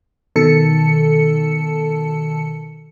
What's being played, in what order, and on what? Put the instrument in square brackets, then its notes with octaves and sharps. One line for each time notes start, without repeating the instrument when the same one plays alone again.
[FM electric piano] B2 D#3 A4 A5 C#7